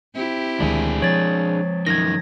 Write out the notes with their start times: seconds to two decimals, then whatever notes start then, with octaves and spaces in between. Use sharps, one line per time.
0.14 C4 E4 G4
0.60 D2 D#3 G#3 D4 G#4
1.02 F3 G#3 C4 C#5 A6
1.87 F#2 D#3 G#6 A#6